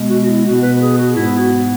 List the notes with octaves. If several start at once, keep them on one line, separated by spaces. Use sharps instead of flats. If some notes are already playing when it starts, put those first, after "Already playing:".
Already playing: B2 G#3 B3
F#4
F#4
E4
B2 B3 F#4
B4
B4
G#4
F#4
G#2 G#3 B3 E4
F#4